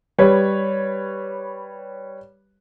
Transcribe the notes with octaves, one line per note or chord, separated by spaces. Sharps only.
G3 B4 C#5